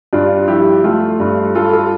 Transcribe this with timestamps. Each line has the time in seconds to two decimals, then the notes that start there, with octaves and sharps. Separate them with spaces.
0.13 G2 D4 F4
0.48 F3 E4 G4
0.84 A3 F4 A4
1.20 G2
1.55 G3 F4 A4
1.73 F4 A4